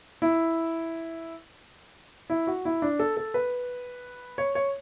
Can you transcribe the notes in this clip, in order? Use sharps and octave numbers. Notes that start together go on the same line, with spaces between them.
E4
E4
F#4
E4
D4
A4
A4
B4
C#5
C#5